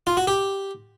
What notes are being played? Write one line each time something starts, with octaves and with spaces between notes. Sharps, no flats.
F4
F#4
G4